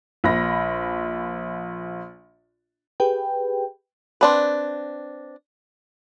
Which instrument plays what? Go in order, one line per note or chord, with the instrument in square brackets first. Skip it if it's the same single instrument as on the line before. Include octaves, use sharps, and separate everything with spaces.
[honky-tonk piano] A#1 B5 A#6
[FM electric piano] G4 G#4 B4 G5
[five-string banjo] C4 D4 B4